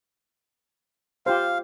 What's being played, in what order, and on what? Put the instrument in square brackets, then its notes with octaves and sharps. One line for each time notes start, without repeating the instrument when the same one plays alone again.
[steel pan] F4 G4 C5 [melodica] F5